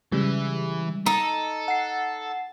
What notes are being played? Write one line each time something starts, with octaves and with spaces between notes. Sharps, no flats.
C#3 E3 G3 G#3
D#4 A4
F#5 C7